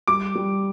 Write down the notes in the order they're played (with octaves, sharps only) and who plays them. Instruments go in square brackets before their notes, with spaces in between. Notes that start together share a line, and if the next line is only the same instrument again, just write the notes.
[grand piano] G3 [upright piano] D6
[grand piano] G3